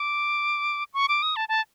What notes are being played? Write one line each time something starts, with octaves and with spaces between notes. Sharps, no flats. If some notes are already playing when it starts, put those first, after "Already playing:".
Already playing: D6
C#6
D6
D#6
A5
A5